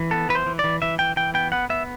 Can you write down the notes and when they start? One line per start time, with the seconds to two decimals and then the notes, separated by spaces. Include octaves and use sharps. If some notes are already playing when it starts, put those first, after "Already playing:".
Already playing: E3
0.11 B3 A4
0.29 E3 B4
0.35 C5
0.46 E3
0.59 E3 D5
0.82 E3 E5
0.99 E3 G5
1.16 E3 G5
1.34 B3 G5
1.52 B3 F#5
1.70 B3 E5